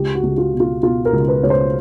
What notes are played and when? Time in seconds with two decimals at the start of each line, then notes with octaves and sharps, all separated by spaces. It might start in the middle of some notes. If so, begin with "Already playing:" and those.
Already playing: C#2 G4
0.15 F#4
0.23 C#2
0.38 F4
0.54 B2
0.60 F4
0.83 B2 F4
1.05 A#4
1.13 C#2
1.28 B4
1.43 C#2 C#5
1.50 C5